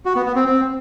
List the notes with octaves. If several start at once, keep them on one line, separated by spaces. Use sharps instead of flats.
F#4
B3
B3
C4
C4